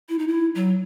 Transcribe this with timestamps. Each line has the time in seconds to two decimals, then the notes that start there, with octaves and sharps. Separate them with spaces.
0.09 E4
0.19 D#4
0.28 E4
0.55 F#3